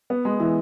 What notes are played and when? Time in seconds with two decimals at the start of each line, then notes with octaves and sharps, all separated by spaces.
0.10 B3
0.25 G#3
0.40 E3